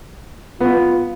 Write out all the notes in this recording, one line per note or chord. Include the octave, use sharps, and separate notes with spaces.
B3 F4